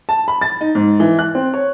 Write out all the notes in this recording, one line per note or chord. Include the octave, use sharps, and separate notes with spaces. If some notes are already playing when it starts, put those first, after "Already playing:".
A5
B5
A6
D#4
G#2
E3
F#6
C4
C#5